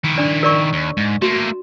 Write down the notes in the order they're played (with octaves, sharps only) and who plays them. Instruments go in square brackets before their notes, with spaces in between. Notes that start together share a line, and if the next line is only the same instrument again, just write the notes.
[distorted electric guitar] D#3 E4
[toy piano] D4 D5
A#4 D5 C#6
[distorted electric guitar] D#2
G#2
[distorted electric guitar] A3 A#3 [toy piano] F#4